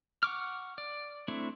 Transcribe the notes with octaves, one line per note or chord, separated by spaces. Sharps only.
F#5 C#6 D6 F6
D5
A3 C4 D4 E4